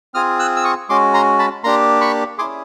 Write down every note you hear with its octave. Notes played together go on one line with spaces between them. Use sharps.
C4 F4 G#4 D#6 F6
E6 F#6
E6
C#6 D#6
G#3 C#4 F#4 C6 D6
A#5 C6
A5 B5
A#3 D4 G4 A#5 C6
B5 C#6
C#4 E4 G#4 C6 D6